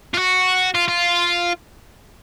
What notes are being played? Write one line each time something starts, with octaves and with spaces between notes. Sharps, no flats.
F4
F#4
F4
F4